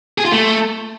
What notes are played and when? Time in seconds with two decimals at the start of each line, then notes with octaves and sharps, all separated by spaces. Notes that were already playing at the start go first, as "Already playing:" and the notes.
0.18 G#4
0.25 F4
0.32 A3